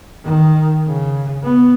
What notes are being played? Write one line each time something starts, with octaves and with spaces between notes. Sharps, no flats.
D#3
C#3
B3